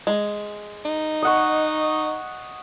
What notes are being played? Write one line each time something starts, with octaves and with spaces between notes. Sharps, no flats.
G#3
D#4
D#5 F#5 C#6